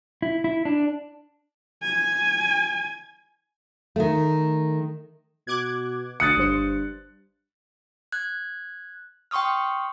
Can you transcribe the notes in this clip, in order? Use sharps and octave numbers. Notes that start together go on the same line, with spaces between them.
E4
E4
D4
G#5
D#3 A3
B2 D6 F#6 G#6
D2 D#6 F#6 A6 C#7
G1 G2 C5
F#6 G#6
G5 C6 C#6 D#6 F6